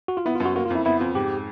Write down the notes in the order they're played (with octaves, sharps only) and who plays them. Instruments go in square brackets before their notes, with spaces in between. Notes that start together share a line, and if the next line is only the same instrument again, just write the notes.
[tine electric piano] F#4
F4
[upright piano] B3 [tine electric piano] E4
[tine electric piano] F4
[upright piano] F#2
[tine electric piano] F#4
[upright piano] A#3 [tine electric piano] F#4
[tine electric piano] F4
[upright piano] F2 [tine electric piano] E4
[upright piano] B3 [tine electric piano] E4
[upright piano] F2 [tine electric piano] F4
[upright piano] G#2 [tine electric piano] G4